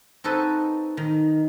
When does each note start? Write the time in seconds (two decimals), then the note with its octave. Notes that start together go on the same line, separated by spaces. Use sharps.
0.24 C4 D#4 F#4 A4 B4 G#5
0.97 D#3